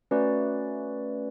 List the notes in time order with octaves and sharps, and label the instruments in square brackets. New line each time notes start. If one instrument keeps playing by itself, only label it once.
[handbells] A3 C#4 F#4 B4 D5